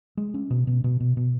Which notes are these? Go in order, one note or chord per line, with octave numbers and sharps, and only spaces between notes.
G#3
C#4
B2
B2
B2
B2
B2